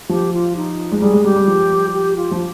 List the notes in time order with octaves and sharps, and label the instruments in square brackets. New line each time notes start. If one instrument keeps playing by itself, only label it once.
[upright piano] F3 [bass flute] G4
[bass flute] F4
D#4
[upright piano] G#3
[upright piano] G3 [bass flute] G#4
[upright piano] G#3
[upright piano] G3 [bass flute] G4
[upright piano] G3
F3
[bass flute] G4
F4
[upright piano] F3